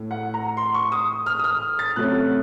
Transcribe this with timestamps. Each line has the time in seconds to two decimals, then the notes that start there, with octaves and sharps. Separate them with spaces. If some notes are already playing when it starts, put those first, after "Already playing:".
Already playing: A2 A3
0.11 F#5
0.34 A#5
0.57 C6
0.74 C#6
0.92 D#6
1.26 F6
1.39 D#6
1.44 F6
1.79 A6
1.96 C3 F#3 A3 C#4 F#6